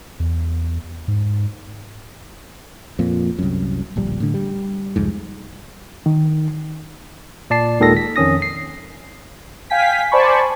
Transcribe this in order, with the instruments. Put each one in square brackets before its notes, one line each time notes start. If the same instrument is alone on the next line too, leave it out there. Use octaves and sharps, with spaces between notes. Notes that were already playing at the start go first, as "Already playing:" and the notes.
[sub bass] E2
G#2
[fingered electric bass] F2 A#2
C2 F#2
D1 A#1 G3
A2 D3
G3
C2 F2 G#2
[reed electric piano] D#3
[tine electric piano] A#2 D5 A5 C7
D#2 A#2 D#3 G#3 A4 A#6
B6
F2 D#3 C#4 D#6 A#6
C7
[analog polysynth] F5 G5 G#5 B6
C5 D5 G#5 A5 B5 C#6